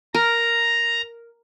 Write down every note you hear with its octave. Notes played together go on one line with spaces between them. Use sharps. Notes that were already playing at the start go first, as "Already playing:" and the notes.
A#4 A#5